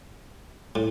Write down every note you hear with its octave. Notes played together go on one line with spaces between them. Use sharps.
A2